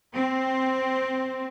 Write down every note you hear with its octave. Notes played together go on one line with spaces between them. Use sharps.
C4